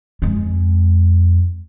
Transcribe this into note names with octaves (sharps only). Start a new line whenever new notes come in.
F2 G#3